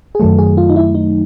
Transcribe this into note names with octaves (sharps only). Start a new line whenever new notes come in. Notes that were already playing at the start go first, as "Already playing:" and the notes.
G#4
F#2 D#3 F#3 A3 A4
G#4
F4
D#4
E4
D#4